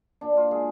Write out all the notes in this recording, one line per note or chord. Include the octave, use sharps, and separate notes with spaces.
A#2 D4
F4
G#3 G#4